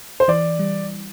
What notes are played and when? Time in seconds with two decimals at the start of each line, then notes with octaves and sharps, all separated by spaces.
0.20 C5
0.28 E3 D5
0.59 G3